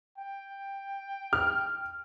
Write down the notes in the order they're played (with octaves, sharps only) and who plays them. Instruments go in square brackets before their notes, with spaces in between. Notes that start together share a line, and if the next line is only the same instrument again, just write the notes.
[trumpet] G5
[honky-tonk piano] F6